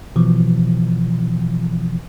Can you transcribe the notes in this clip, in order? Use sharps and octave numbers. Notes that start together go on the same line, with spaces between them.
B2 E3 F3